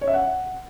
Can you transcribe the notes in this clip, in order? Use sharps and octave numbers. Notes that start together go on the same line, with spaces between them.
C#5
E5
F#5